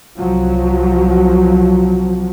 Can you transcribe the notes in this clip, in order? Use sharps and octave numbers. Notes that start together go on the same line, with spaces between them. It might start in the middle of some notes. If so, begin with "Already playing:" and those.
C2 F3 F#3